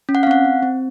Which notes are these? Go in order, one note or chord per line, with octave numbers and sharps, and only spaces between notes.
C#4
F#5
F5
C4 F#5
C4
C4